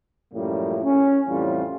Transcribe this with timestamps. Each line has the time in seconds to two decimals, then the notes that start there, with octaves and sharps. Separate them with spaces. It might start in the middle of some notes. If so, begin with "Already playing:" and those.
0.32 F#2 A2 F3 G3 A#3
0.83 C#4
1.28 F2 A2 E3 G3 C#4 F4